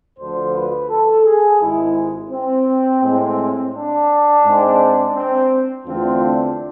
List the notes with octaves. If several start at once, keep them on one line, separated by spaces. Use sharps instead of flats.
D2 D3 F3 C5
B4
A4
G#4
G#1 G#2 G#3 E4
C4
A2 G#3 C4
D4
G#2 G#3 C4
C4
E2 D3 A3 C4 F4
D4